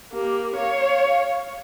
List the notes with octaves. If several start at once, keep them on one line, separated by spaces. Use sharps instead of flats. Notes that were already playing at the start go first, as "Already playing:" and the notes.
A#3 G4
C#5 F5